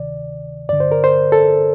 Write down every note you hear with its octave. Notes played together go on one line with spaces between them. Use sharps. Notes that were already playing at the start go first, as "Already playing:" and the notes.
Already playing: D2 C3 D#3 D5
G2 D3 D5
C5
A#4
C5
A4